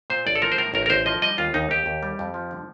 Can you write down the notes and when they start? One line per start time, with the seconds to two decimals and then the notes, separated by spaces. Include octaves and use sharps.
0.10 A#2 C5
0.26 A1 D5
0.35 A4
0.42 F3 A#4
0.52 C5
0.58 A2 A#4
0.74 A1 A#4
0.86 A#4
0.90 A1 C5
1.06 F3 D#5
1.22 G3 D#5
1.38 D#2 F4
1.54 D#2 D#4
1.71 D#2 G4
1.86 D#2
2.03 G3
2.19 F2
2.34 F3
2.51 D3